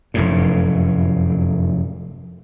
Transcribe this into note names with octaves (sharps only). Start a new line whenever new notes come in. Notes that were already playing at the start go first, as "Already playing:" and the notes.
F1 F#2 A2